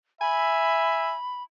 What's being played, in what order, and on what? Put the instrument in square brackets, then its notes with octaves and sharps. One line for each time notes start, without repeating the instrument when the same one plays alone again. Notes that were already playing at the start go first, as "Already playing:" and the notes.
[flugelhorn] E5 [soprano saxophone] G#5 [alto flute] B5